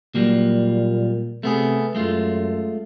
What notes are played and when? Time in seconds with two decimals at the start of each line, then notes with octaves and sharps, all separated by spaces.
0.15 A#2 F#3 G3 A#3
1.43 C3 A3 B3 G#4
1.95 F#2 G#3 A3 F4